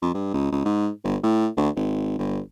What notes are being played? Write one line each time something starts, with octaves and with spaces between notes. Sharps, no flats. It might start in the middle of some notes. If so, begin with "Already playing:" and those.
F2
G2
C#2
C#2
G#2
G1
A2
D2
G#1
G1